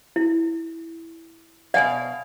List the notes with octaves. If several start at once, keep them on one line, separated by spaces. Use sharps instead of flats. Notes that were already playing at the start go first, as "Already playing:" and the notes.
E4
B2 D5 F5 F#5 G#5